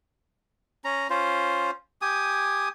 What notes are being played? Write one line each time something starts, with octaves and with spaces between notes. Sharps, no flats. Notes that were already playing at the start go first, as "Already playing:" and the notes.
C#4 A#5
C#4 F4 C5
G4 G#5 D#6